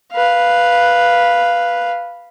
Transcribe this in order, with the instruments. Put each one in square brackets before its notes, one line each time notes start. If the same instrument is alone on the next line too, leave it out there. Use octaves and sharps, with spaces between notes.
[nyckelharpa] B4 F5